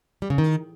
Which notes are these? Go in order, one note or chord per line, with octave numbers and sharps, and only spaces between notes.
G3
C#3
D#3